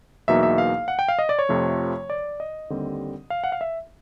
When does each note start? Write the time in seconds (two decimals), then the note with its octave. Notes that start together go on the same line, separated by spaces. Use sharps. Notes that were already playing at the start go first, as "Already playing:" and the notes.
0.28 E2 B2 F#3 A#3 D#4 E5
0.43 E5
0.58 F5
0.88 F#5
0.99 G5
1.08 F5
1.19 D#5
1.29 D5
1.39 C#5
1.49 F2 C3 F3 A3
2.10 D5
2.40 D#5
2.70 D#2 D3 G3 C4
3.30 F5
3.44 F#5
3.52 F5
3.61 E5